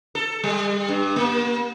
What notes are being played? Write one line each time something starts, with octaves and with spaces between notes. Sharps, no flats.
A4
G3
G2
A#3